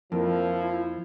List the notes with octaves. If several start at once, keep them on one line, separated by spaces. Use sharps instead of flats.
F2 F3 A#3 E4 F4 A#4